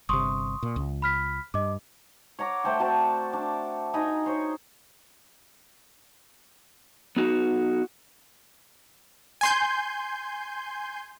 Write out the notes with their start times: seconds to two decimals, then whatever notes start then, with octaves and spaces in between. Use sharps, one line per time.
0.09 G1 C3 C6 C#6 D#6
0.63 A#2
0.76 C#2
1.02 B5 F6 B6
1.54 G2 D#5 D6
2.39 C#5 F#5 A#5 D6
2.64 A3 A4 C5 G5
2.79 C4 F#4 D5 A5
3.33 D4
3.94 D#4 G#5 A#5 B5
4.26 C5 C#5
7.16 B3 D#4 F#4
9.41 G#5 C6 G6